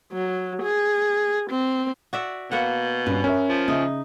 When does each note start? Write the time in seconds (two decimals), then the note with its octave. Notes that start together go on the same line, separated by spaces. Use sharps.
0.12 F#3
0.62 G#4
1.50 C4
2.13 F#4 D5 E5
2.51 B2 A#3 B4 F#5
3.06 G2 C#4 B4
3.24 C#4 A#4 E5
3.49 F3
3.68 C#3 D#4 E5